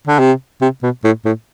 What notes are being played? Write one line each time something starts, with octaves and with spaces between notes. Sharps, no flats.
D3
C3
C3
B2
A2
A2